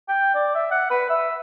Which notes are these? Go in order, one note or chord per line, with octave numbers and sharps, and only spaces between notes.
G5
D5
E5
F#5
B4
E5